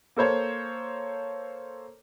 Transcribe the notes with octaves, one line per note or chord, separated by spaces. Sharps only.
A#3 A4 C5 C#5